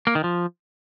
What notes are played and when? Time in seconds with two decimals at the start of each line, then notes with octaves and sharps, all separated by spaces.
0.07 A#3
0.15 D#3
0.24 F3